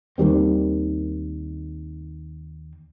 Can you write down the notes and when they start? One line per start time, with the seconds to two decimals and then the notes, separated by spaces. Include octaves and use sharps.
0.18 D#2 D#3 G3 C4